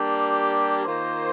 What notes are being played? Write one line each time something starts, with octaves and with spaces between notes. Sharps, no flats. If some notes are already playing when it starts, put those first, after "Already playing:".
Already playing: G3 A#3 D4 G4
D#3 A#3 F4 C5